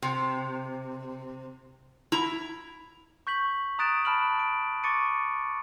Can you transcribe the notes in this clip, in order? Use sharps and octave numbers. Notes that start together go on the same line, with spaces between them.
C3
E4 A#5
C#6 G6 B6 F#7
A#5 D#6 F#6 A6 D7 E7
A5 B5 F6 D7 F#7
D7
C#6 D6 A6 C#7 D#7